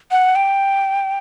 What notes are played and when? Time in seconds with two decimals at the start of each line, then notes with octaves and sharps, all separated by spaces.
0.11 F#5
0.36 G5